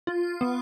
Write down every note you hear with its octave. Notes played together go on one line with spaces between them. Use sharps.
F4
B3